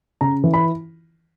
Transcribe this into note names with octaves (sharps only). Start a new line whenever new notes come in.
C#3 A#5
E3
B5